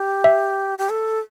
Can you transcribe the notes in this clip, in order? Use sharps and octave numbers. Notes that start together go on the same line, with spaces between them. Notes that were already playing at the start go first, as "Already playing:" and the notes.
Already playing: G4
E5
G4
A4